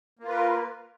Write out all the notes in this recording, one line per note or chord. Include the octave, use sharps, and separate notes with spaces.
A#3 F4 A#4 B4